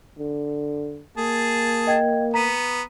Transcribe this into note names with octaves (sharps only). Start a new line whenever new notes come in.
D3
A#3 G#4 A5
D#5 G5 G#6
B3 A#5 B6 D#7